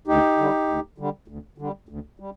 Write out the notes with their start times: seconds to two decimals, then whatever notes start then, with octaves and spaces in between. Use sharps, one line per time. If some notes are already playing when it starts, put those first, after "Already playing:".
0.07 D2 D#4 G4
0.37 D3 G3
0.68 D2
0.98 D3 G3
1.28 D2
1.58 D3 G3
1.89 D2
2.20 G3